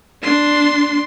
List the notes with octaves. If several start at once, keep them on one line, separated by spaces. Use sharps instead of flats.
D4 C6